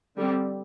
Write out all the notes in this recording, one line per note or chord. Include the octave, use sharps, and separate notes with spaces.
D3 G3 C4